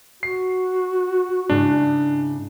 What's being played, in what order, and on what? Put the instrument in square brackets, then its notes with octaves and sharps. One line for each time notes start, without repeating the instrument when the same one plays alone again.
[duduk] F#4 [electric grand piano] C7
[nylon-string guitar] G#2 C#3 E4 [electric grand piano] D4